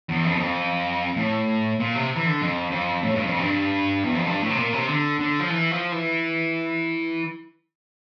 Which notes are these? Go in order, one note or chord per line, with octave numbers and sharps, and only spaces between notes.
E2
F2
E2
F2
A2
A#2
C3
E3
D3
F2
F2
A2
G2
F2
G2
E2
F2
G2
A2
C3
A#2
C3
D3
D3
F3
E3
F3
E3